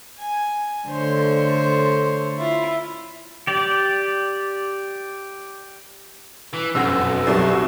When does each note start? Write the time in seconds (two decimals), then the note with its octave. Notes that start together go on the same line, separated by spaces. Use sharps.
0.19 G#5
0.87 D3 A3 C5 C#5
2.38 E4 F4
3.47 G4 D5
6.53 E3
6.75 F1 B1 F#2 D#5 F#5 E6
7.27 C2 F#3 D#4 F#4 G4 A#4 D5